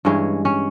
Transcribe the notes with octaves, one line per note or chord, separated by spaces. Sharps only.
G2 E3 G#3 C#4
C#4